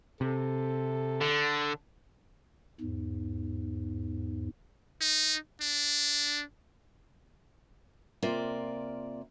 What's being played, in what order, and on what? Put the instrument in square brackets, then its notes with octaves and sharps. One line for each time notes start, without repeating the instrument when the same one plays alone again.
[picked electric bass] C3 [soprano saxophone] A4
[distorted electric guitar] D3
[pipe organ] E2 G#2
[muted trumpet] D#4
D4
[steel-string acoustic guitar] C3 A#3 F4 D5